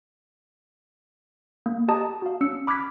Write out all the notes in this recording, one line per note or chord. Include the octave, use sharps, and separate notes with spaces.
A#3
G4 D#5 A5 A#5 D#6
F#4 F5
C#4 E6 C#7
B5 D6 F6 F#6 G#6 B6